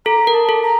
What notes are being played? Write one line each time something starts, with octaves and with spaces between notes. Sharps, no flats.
A4 A#5
A#4
A5
A4
A#5